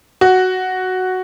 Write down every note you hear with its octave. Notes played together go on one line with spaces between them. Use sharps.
F#4